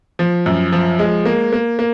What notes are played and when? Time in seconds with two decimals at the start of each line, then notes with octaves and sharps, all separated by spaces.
0.19 F3
0.46 F#2
0.72 F3
0.99 G#3
1.26 A#3
1.53 A#3
1.79 A#3